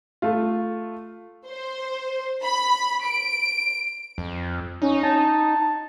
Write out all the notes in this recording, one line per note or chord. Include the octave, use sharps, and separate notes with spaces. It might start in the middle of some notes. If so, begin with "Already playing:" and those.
A3 F4
C5
B5
D7
F2
C#4 D#4
A5